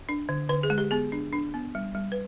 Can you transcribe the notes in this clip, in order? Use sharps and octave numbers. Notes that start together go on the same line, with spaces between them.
D4
D3
D3 B4
G#4
G#3
G4
B3 G#4
D4
D4
B3
G3
G3
B4